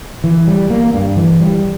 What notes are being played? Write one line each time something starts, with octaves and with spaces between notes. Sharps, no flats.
E3
G3
A#3
G2
E3
G3